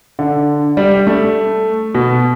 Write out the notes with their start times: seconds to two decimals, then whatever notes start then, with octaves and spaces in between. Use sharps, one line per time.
0.19 D3
0.77 G3
1.07 A3
1.95 B2